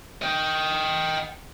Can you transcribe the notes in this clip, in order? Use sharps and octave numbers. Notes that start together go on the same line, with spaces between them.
D#5 G5